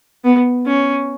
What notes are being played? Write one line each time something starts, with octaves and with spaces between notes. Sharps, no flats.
B3
C#4